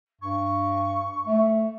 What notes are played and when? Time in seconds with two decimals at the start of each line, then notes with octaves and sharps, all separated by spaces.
0.21 G2 C#6
1.27 A3